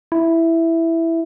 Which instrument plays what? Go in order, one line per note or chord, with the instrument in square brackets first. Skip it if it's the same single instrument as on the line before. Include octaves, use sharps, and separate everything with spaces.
[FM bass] E4